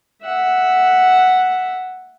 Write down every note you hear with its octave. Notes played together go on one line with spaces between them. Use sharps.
E5 F#5